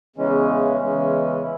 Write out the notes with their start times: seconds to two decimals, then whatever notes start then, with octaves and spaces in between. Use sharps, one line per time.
0.16 E2 C#3 E3 G#3 C#4
0.79 E2 C#3 E3 G#3 C#4
1.42 E3 E4